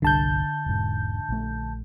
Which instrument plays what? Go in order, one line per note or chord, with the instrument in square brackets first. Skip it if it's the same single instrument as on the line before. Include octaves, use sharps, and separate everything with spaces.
[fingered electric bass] G1 C2 G3 [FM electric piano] D3 A5 G6
[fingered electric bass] E1 G#2
A#1 A3